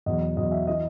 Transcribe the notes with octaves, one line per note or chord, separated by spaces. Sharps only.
E2 B2 F#3 D#5
E2 B2 F#3 D#5
E5
E3 D#5